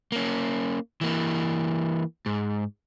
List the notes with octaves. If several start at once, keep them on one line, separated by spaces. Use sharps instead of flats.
A#3 C#4
E3 A#3
G#2